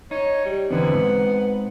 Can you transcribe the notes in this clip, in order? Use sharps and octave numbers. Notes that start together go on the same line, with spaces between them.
D#4 C#5
G3
E2 D3 E3 B3 C4 D#4
G#2